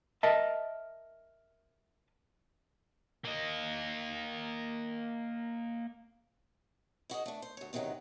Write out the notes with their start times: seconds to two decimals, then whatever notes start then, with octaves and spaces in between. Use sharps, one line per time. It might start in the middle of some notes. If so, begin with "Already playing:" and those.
0.23 A#4 D#5 E5 A5
3.24 A#3 D#5
7.10 E4 F#4 G#4 D#5
7.26 A3 D4
7.42 C5
7.57 D2 C#5
7.73 E2 C3 D#3 E3 F#3 C#4